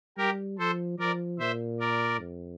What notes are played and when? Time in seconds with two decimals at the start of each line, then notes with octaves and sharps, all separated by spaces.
0.18 G3 G4 A#4
0.59 F3 A4 C5
0.99 F3 A#4 D5
1.39 A#2 C5 E5
1.80 A#4 D5
2.20 F2